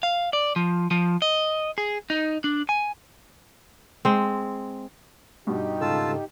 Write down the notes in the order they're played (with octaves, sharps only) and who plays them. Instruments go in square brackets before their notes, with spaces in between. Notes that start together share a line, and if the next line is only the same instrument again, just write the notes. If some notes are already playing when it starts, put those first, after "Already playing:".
[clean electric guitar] F5
D5
F3
F3
D#5
G#4
D#4
D4
G#5
[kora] G#3 C4
[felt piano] G2 B2 [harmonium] D#4 G4
[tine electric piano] G#2 C#3 A4 [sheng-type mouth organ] F4 A5 E6